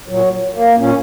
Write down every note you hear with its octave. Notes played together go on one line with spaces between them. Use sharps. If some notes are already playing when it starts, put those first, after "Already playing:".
A#2 F#3
A#3
A#2 C#4